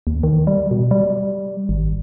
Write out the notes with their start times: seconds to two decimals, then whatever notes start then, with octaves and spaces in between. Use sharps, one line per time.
0.07 D#2
0.23 D#3
0.47 G3
0.71 B2
0.91 G3
1.69 G#1